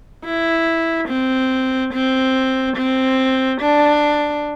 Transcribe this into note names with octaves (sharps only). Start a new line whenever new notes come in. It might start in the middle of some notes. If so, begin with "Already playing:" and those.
E4
C4
C4
C4
D4